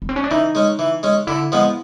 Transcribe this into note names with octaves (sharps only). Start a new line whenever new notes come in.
B3
C4
C#4
D4
E3 D#4
G#3 C#4
E3
G#3 C#4
D3 E4
F3 G#3 B3